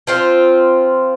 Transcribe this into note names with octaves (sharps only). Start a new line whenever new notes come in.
F3 C4 F4